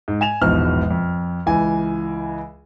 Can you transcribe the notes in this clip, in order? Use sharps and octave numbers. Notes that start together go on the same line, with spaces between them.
G#2
G#5 E7 F7
E1 A#1 G#2 B2 F6
F2
C#2 E3 G#5